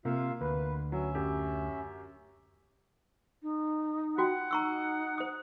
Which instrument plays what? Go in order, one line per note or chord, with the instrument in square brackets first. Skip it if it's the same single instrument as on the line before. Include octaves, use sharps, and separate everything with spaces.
[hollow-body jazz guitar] C3 [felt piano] A#3 [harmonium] F4 E5 F5
[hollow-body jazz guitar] D2 [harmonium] B4
[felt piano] F#3 [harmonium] C#4 E5
[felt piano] F#2 G4
[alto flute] D#4
[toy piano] F4 F#4 G5 [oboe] F#5
[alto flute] D#4 [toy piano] A#5 C#6 E6
[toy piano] C5 D#6